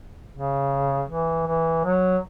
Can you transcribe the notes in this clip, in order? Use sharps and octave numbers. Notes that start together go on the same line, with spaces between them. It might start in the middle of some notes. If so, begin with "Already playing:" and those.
C#3
E3
E3
F#3